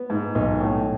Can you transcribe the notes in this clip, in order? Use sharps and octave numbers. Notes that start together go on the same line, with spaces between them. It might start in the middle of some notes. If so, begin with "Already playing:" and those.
Already playing: B3
G#2
B1
A2